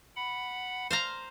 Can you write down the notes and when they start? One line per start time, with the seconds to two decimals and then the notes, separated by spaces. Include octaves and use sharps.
0.16 F#5 B5
0.90 C5 F5 A#5